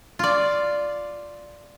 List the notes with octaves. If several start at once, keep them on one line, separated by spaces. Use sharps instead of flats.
F4 D5